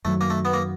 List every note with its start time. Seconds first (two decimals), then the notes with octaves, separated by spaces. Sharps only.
0.05 F#2 D#3 F#3 A3
0.21 A#3
0.30 A3
0.45 B3
0.53 A#3